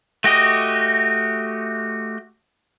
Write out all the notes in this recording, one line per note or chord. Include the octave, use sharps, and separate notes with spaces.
A3 F#4 G4 D#5